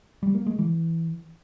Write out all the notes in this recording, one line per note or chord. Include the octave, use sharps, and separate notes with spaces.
G3
A#3
G#3
E3